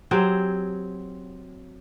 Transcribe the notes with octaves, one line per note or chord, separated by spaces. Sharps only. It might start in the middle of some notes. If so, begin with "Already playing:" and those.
F#3 C4 G4 G#4